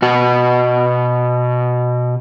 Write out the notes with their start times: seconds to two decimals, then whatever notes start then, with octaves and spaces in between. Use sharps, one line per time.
0.02 B2 F#4